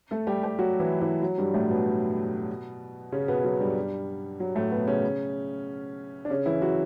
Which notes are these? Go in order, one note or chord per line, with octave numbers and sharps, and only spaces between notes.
A3 A4
G3 G4
G3 G4
F#3 F#4
E3 E4
E3 E4
F#3
G2 G3
A2 A3
B2 B3
C#3 C#4
B2 B3
F#3
G2 G3
F#3
A2 A3
B2 B3
C#3 C#4
D4
C#3 C#4
E3 E4
F#3 F#4